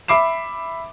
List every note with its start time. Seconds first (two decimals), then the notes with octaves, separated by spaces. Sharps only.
0.08 E5 B5 D6 C7 E7